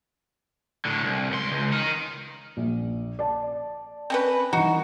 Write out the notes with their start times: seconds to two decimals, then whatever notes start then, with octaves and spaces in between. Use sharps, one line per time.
0.85 A2 D3
1.03 C2
1.31 C#2 C6
1.52 C#2
1.73 D#4 A#4
2.57 A#1
3.19 D5 A5
4.10 C4 C#4 B4
4.53 D#3 E3 D#4 F#4